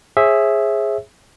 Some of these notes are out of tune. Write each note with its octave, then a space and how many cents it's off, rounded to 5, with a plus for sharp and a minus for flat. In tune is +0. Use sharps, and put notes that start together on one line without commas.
G#4 +0 C#5 -45 E5 +0